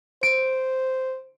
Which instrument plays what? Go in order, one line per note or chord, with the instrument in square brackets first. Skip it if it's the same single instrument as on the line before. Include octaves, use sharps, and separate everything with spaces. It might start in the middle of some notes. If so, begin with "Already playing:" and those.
[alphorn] C5 [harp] D7